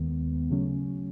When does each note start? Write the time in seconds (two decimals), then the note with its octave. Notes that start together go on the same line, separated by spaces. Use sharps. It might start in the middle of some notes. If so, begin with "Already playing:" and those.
Already playing: D#2 D#3 G#3 B3
0.50 C#3 F#3 A3 C#4